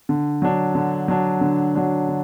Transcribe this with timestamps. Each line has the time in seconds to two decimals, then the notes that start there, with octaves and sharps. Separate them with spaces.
0.09 D3
0.42 F#3 D4
0.75 D3
1.08 F#3 D4
1.41 D3
1.75 F#3 D4
2.08 D3